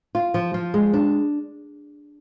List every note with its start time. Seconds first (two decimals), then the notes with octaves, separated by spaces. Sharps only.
0.15 F4
0.34 F3
0.54 F3
0.74 G#3
0.94 D4